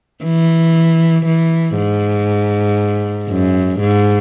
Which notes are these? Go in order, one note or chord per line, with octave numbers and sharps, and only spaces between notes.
E3
E3
G#2
F#2
G#2